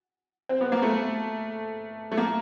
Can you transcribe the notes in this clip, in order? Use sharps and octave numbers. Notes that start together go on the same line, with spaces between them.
C4
B3
A#3
A3
A3
A#3